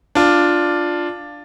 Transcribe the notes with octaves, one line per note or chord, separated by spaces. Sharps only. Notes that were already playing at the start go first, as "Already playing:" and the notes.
D4 F4